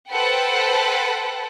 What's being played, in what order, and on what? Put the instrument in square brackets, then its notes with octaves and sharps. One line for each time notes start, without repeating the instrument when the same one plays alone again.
[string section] A4 B4 C5 F#5 G5